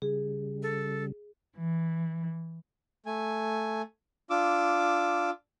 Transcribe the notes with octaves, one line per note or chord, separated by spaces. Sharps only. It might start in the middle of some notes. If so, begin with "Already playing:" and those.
C#3 G3 G#4
A4
E3
A3 G#5
D4 F4 D6 E6